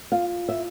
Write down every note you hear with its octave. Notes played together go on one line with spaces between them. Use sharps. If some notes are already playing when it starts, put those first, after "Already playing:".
F4 F5
E5